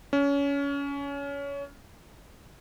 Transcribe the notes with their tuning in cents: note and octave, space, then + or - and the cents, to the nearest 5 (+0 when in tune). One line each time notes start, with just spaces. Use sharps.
C#4 +25